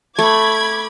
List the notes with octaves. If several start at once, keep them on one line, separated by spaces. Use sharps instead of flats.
A3 B5 D6 G#6